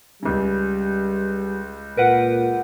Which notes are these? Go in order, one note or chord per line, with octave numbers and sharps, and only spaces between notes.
C#2 C#3 G3
A#2 A#4 B4 F#5